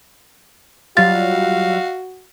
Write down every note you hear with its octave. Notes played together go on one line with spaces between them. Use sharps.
F#3 G3 F4 F#4 F5 A6